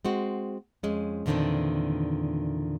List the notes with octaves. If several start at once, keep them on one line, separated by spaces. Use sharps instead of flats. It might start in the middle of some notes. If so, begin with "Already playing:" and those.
G#3 C4 F#4
F2 G#3 C#4
E2 A#2 D3 D#3 C4 D4